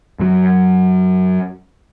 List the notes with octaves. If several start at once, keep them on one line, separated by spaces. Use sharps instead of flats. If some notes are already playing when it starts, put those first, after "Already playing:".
F#2 F#3